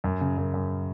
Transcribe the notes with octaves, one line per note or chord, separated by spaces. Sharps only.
F#2
C#3
F#2
F#2